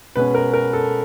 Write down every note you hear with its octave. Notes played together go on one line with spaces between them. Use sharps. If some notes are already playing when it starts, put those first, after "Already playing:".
B2 G#3 C#4 B4
A#4
A#4
A4